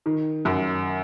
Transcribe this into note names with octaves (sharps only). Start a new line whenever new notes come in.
D#3
F#2